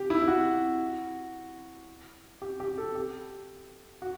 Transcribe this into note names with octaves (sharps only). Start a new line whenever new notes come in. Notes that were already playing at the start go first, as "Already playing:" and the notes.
Already playing: G4
E4
E4
F#4
G4
G4
A4
G4
F#4